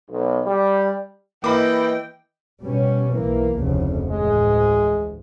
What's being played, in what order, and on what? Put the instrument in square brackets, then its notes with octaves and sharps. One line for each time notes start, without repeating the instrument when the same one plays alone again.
[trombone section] B1
G3
[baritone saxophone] E3 [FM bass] A#3 [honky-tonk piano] D#5 B5 D6 [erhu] G5
[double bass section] B2 G3 C#4
B1 E3 A#3
F1 D2 C#3
[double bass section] A1 D2 [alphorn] G#3